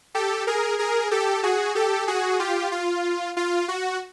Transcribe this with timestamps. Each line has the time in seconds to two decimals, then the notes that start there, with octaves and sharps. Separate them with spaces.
0.15 G4 A4
0.47 G#4 A#4
0.79 G#4 A#4
1.11 G4 A4
1.43 F#4 G#4
1.75 G4 A4
2.07 F#4 G#4
2.39 F4 G4
2.72 F4
3.37 F4
3.68 F#4